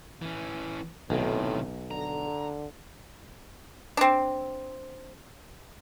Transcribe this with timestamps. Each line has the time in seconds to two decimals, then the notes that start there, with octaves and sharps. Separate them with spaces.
0.22 E3 C#4
1.10 B1 A2 C3 D#3
1.91 D3 A#5
3.97 C4 D4